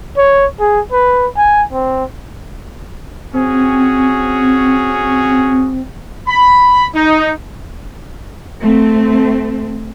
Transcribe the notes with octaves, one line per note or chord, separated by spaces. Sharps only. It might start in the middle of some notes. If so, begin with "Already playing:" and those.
C#5
G#4
B4
G#5
C4
C4 C#4 F#4 G#4
B5
D#4
A3 C4